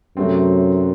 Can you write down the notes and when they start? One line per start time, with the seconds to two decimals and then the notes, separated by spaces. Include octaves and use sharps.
0.17 F#2 C3 F#3 A3 C4